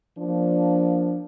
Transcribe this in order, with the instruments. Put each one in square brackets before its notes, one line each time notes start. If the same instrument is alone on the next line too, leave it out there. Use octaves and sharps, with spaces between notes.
[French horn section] F3 A#3 D4